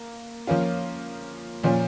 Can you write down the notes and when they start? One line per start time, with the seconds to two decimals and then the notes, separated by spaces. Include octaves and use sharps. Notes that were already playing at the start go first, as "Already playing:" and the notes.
Already playing: A#3
0.47 F3 A#3 C#4 F4
1.63 A#2 F3 C#4 F4